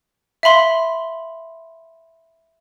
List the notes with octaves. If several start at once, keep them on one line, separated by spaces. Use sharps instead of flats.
E5 F5 B5 C6